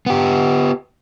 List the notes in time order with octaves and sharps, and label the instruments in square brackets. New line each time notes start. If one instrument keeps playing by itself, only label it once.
[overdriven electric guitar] B3 G4